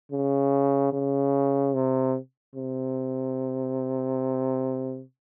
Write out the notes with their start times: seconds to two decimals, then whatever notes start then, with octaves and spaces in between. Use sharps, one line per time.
0.12 C#3
0.93 C#3
1.74 C3
2.55 C3